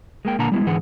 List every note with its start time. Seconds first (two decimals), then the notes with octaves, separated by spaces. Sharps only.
0.25 G#3 A#3 G5
0.39 A#2 D3 A#3 F#5 A5 A#5
0.52 G3 G#3 B3 E4
0.66 G#2 D3 E3 G#4 F#5